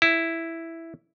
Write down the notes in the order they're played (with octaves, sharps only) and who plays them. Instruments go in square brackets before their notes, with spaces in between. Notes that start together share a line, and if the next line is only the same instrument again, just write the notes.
[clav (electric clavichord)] E4